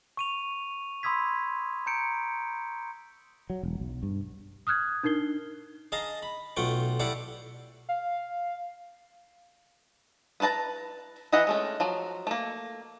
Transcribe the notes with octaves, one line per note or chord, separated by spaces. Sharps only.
C#6 D#7 F7
B5 C6 D#6 E6 G#6 B6
A#5 G6 C#7 D7
F#3
E1
B1
G2
D#6 F6 F#6 G#6
D4 D#4 A#4 C7 G7
G#4 D#5 F5 A5 A#5
B5
B1 A3 F4 F#5 G5
E4 G4 A4 D5 F5 F#5
F5
B3 E4 B4 A5 A#5
E3 E4 D#5 F#5 A#5
G#3 A3 C#4
F3 F#3
A3 A#3